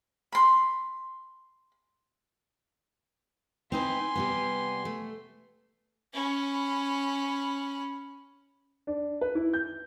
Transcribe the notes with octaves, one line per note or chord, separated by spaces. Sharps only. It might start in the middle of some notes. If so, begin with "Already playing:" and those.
B5 C6
C4 D#4 B4 G#5 C6
C3 G3 B3
A3
C#4 B5
D4
B4
E4
G6